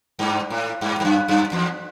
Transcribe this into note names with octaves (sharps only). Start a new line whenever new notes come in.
G2
A2
G2
G2
F#2
F#2
E2